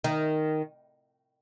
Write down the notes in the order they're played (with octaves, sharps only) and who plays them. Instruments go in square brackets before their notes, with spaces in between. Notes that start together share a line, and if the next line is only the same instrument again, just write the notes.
[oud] D#3